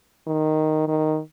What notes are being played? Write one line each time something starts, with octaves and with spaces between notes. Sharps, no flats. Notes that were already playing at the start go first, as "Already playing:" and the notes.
D#3
D#3